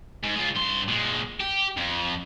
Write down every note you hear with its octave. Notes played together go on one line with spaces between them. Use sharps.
G#2
G#3 F4
G2 C6
A#2 G#3
G4
F2